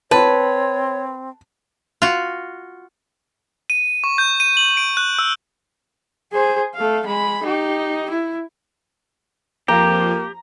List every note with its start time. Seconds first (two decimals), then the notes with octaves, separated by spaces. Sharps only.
0.11 C4 B4 C#5 A5
2.02 F4 F#4
3.70 D#7
4.04 C#6
4.18 G6
4.40 D#7
4.57 F#7
4.77 D7
4.97 F#6
5.19 E6
6.33 G#4 C5
6.75 A3 F5
7.06 G#3 B5
7.43 D#4 G4
8.10 E4
9.68 F2 F3 A#3 G4 A#5